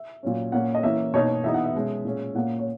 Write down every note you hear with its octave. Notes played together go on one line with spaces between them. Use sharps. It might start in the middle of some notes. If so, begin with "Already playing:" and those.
Already playing: E5
A#2 F#3 C#4
A#2 A#3 C#4 F#5
D#5
E3 A#3 C#4 E5
B2 A#3 D#4 C#5
E3 B3 D#4 E5
F#5
E5
B2 G#3 C#4
A#2 G#3 C#4
A#2 A#3 C#4 F#5
C#5